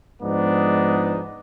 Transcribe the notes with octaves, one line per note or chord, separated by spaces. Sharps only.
G#2 F3 G#3 B3 D4 D#4